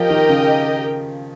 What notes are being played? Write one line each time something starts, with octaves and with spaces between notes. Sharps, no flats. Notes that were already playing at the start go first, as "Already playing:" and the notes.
Already playing: F3 G4 A#4 D#5 G5
D#3
C#3